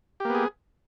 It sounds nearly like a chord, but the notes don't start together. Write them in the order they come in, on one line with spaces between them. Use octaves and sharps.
G4 A#3 B3 G#4